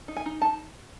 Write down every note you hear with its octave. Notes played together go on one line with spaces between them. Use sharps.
D#4
G#5
D#4
D#4 A5